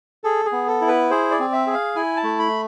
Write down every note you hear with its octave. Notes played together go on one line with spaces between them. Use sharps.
G#4 A4
G#4
B3
A4
E4
B4
G#4 C5
D5
C4
E5
G#4
F5
E4 G#5
A5
A3
B5